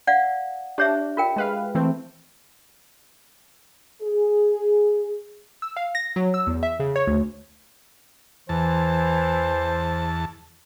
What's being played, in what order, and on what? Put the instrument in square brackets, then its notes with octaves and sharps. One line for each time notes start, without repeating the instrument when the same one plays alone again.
[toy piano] D5 F5 F#5
[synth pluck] D4 [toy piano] G4 C#5 E5
[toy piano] F4 A#4 G5
[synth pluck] G#3 B4 F5
E3 A3 C4
[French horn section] G#4
[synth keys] E6
F5
A#6
F#3
E6
E2
E5
C#3
C#5
D2
[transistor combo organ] E2 A5 [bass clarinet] E3 [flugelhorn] C5